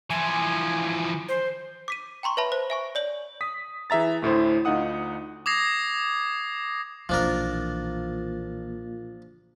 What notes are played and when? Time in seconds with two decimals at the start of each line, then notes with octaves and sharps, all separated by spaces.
0.10 E3 F3 G#5
1.29 C5
1.88 D6 B6 D#7
2.23 G5 A#5 C6 C#6
2.37 B4 C#5 E5 A5 B5
2.52 C5
2.70 E5 G#5 C#6
2.95 C#5 D5 F#7
3.41 D#6 B6
3.90 E3 G#4 E5 A#5 A6
4.22 D2 A2 E4 C5
4.65 D2 D#4 F4 F#5 D#6
5.46 D6 D#6 G#6 A#6 C7
7.09 B1 A#2 E3 F3 D4 A#4